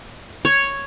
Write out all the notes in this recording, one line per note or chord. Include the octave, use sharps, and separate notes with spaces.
C#5